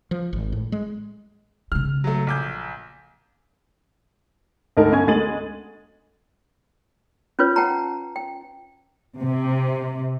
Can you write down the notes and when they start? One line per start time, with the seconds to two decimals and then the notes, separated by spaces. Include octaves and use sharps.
0.11 F3
0.33 G#1
0.52 A2
0.72 G#3
1.72 C#3 G#3 F6
2.04 F#3 A3
2.27 A#1 D6 G6
4.77 D2 G#3 D#4 A#4 A5
4.92 G1 C#4 G#5 G#6
5.07 D2 G#3 A6 D#7 F#7
7.39 C#4 F4 B4 C#5
7.56 F#5 G5 A5 A#5
8.16 G5
9.19 C3